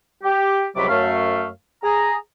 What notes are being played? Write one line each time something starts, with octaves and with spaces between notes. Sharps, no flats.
G4
C#2 C3 F#3 G3 B5 D6
F#2 A3 F5
G#4 A#5